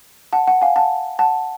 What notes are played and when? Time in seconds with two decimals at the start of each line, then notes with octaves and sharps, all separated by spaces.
0.32 F#5 A5
0.48 F#5
0.62 F5 G#5
0.76 F#5 A5
1.19 F#5 A5